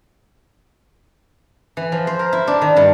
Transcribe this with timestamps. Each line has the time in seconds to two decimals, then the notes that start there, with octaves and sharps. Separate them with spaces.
1.77 E3
1.92 F3
2.07 C5
2.19 A#4
2.33 E4
2.47 D4
2.62 D#3
2.76 G2